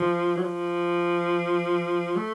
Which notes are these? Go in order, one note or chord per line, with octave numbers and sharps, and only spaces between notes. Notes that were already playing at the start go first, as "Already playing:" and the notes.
Already playing: F3
F#3
F3
A3